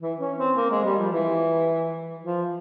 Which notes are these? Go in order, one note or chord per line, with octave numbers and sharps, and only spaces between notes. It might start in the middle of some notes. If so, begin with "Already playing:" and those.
E3
C#4
C4
A#3
G#3
G3
F3
E3
F3